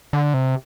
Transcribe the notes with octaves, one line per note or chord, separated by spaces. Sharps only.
D3
C3